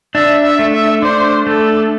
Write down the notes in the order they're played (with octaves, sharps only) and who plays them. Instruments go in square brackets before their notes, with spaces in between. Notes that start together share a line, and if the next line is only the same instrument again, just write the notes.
[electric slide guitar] D4 [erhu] E5
[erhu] E5
[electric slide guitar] A3
[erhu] E5
[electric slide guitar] D4 [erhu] C5
[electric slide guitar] A3 [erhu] A4